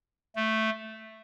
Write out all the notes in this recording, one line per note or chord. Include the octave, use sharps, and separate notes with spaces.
A3